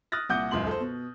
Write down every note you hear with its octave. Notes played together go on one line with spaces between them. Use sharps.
D#6 F6 F#6 A6 A#6
C2 A#2 F#5 D6 D#6 G6
D#1 C#2 F#2 C6 F#7
A4 C5
B2